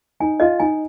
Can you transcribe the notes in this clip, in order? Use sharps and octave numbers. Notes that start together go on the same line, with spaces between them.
D#4 G#5
F4 D#5
D#4 G#5